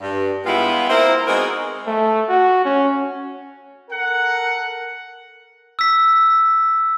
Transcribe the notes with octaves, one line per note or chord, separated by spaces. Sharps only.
G2
G3 G#3 B3 E4 F4
A#3 C4 E4 A#4 C5
G#3 B3 C4 D#4 F#4 A#4
A3
F#4
C#4
A4 A#4 F#5
E6 B6